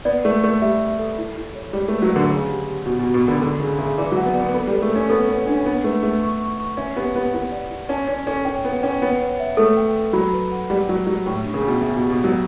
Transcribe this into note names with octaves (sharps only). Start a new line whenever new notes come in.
B3 D5
A3 D5
A3 D5
G3 E5
E5
A4
E4
E4
C#5
G3 D5
A3 B4
F#3
D3 F#5
C#3 C#5
G4
G4
B2 F#4
B2 F#4
B2
B5
D3
D3 A4
C#3 E4
C#3 E5
E3 D5
F#3
F#5
B3
D5
B3
B3 A4
G3
A4
A3
C#4 A4
B3 A4
B3 C#5
C#4 D4
B3 B4
A3 B4
A3 F#5
C#6
C#6
C#6
C#4 E5
B3 G4
B3 G4
B3 E4
D5
E4
C#4 A5
C#4 D5
C#4 A4
C#4 G5
B3 G5
C#4 G5
B3 C#5
C#5
E5
A3 A4
G5
A4
F#3 B5
B4
F#5
G3 F#5
F#3 G4
F#3 G4
A2 C#5
D4
C#3
B2 C#5
C#3 E5
B2 G4
B2
F#3 G4